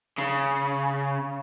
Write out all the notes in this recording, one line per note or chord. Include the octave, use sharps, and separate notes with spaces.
C#3